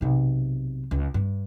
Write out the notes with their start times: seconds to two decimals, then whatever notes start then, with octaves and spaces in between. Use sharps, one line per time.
0.01 B1 C3
0.91 C#2
1.14 G2